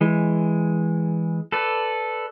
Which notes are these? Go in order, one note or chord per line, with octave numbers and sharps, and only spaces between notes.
E3 G#3
A4 B4 D5